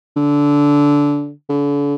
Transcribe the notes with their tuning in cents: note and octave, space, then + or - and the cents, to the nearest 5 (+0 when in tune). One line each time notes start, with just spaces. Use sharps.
D3 -15
D3 -40